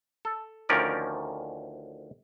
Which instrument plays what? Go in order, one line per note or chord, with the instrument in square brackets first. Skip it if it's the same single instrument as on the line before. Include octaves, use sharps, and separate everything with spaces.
[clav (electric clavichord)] A4
D2 D#3 F3 C#4 A#4 D5